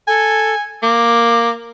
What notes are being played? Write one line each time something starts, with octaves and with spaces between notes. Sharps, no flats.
A4 G#5
A#3 D6